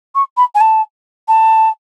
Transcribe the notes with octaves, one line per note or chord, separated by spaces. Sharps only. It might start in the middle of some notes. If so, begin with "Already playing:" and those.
C#6
B5
G#5
A5
A5